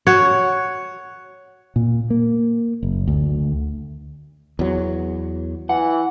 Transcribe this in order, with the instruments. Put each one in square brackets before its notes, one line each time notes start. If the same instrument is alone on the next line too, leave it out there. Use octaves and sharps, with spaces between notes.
[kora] F#4 C#5
[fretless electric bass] A#2
A#3
F#1
D2
E2 F#3
[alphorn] E3 [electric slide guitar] F#5